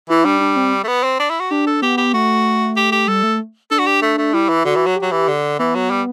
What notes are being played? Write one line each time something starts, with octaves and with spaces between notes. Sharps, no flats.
E3 E4
G3 D4
D4
C4
A3
B3
C4
D4
E4
F#4
D4 G4
A4
B3 G4
G4
A3 F#4
G4
G4
G3 A4
A3
D4 A4
F#4
G4
A3
A3
G3 E4
E3
D3 F#4
E3
F#3
G4
F#3
E3
D3
E3 B3
F#3
G3